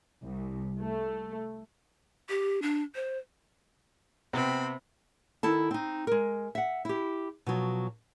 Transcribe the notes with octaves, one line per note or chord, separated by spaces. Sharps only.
C2
A3
G4
D4
C5
C3 B3 C4 B5
D#3 E4 A4 A5
C4 D#4
G#3 A#4
E5 F#5
E4 G4
B2 F3 F#3